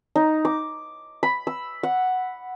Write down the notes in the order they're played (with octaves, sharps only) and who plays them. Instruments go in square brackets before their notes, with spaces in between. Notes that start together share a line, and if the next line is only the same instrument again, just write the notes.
[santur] D#4
D6
B5
E6
F#5